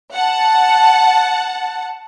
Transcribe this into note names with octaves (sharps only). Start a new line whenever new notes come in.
F#5 A5